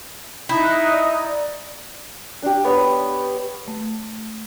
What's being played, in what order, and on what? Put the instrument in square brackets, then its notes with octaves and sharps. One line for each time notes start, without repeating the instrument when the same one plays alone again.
[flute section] D#4 [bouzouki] E4
[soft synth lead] F#6
D5
[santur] D4 G4
B3 C#5
[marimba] A3